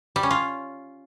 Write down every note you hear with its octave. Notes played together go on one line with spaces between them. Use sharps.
G3
C#4
F4